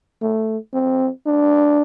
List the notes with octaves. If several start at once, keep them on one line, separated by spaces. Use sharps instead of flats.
A3
C4
D4